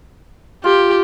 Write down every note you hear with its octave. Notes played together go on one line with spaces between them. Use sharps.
F4 G4